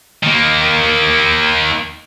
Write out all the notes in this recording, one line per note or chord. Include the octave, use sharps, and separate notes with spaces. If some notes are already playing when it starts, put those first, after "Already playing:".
D#3 A#3